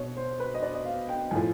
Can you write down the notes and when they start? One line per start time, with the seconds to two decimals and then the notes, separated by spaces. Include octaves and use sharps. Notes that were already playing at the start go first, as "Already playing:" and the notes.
Already playing: B2 C#5
0.17 C5
0.40 B4
0.54 D#5
0.63 D5
0.74 D#5
0.85 F5
1.09 G5
1.31 A2 F3 G#5